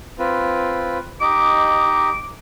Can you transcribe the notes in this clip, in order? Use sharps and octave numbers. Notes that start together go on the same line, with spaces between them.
C4 F4 B4
D#4 G4 D#5 D6